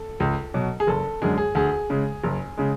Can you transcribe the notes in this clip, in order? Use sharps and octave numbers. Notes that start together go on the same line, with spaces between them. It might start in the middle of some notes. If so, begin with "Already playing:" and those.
Already playing: A4
C#2
B2 F#3
G#4
F#1 A4
F#2 D3 G#3 G#4
G#4
D2 G#4
C#3 G#3
F#1
C#3 G#3